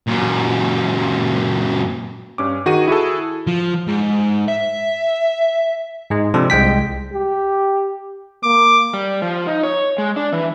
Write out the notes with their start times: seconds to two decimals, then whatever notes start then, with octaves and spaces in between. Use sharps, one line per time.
0.07 F#2 A#2
2.38 G2 C#4 D6
2.66 D#3 F#4 G#4 D#7
2.88 E4 F#4 G#4 A4
3.47 F3
3.88 G#2
4.48 E5
6.10 G#2 G#3
6.34 C3 F3 D4 A4
6.50 C2 G#3 G5 B6
7.13 G4
8.44 A#3 D6
8.94 G3
9.22 F3
9.47 D#4
9.63 C#5
9.98 G#3
10.16 D4
10.32 E3